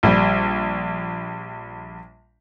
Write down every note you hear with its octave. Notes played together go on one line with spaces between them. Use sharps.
A#1 G3